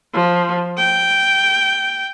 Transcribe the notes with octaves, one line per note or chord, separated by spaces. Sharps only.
F3
G5